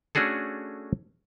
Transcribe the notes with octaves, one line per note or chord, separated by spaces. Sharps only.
A3 C#4 D4 F#4 G#4 A4